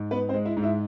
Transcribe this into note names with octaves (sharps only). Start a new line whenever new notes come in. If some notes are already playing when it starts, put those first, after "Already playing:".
Already playing: G#2
B3 B4
C4 C5
G#3
E4 E5
G#2
E4 E5